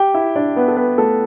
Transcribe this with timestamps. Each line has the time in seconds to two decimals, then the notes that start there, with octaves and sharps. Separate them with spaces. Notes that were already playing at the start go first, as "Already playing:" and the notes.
Already playing: G4 G5
0.14 E4 E5
0.36 D4 D5
0.56 B3 B4
0.68 A4
0.77 B3 B4
0.98 A3 A4